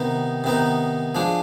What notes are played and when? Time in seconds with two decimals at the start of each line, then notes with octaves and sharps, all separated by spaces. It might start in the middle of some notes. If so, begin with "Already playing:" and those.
Already playing: C3 D#3 B3 D#4
0.44 C3 D#3 B3 D#4
1.15 F3 G#3 D4